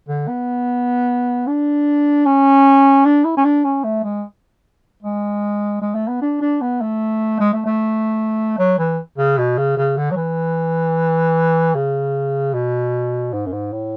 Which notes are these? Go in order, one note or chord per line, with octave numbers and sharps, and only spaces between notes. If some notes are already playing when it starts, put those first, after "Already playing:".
D3
B3
D4
C#4
D4
E4
C#4
D4
C#4
A3
G#3
G#3
G#3
A3
B3
D4
D4
B3
A3
G#3
A3
A3
F#3
E3
C#3
B2
C#3
C#3
D3
F#3
E3
C#3
B2
G#2
F#2
G#2
A2